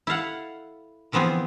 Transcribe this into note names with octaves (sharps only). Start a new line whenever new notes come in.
E4 A4 F5 F#5
D3 E3 F3 B3 C4 G#4